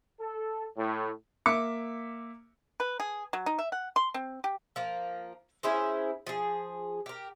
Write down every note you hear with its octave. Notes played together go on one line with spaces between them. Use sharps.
A4
A2
A#3 E5 D6 C#7
B4
G#4
F#3
D#4
E5
F#5
C6
C4
G4
F3 A#3
C#4 E4 G#4 C5
F3 G#4
G4 A#4